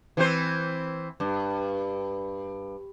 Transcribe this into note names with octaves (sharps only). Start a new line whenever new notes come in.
E3 C4 C5
G2